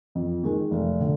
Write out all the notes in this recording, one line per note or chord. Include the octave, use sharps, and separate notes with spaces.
F2
D#3 G#3
F1
D3